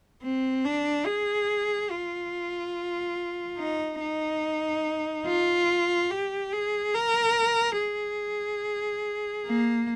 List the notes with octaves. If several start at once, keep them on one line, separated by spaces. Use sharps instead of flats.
C4
D4
G#4
F4
D#4
D#4
F4
G4
G#4
A#4
G#4
A#3